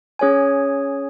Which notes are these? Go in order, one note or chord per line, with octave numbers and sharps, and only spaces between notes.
C#4 G#4 C#5 G#5